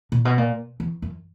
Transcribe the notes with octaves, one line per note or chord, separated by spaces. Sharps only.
A#2
B2
A#2
E2
F#2